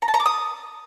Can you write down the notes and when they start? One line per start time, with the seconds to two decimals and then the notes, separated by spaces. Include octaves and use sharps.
0.02 A#5
0.08 A5
0.14 A#5
0.20 D6
0.26 D#6